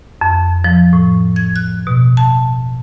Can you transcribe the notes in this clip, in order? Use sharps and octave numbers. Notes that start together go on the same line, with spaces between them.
F2
F3
A2
G#6
F#6
B2
A5